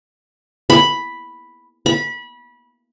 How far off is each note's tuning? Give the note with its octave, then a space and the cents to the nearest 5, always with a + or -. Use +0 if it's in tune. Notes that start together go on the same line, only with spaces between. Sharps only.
B5 +0
B5 -25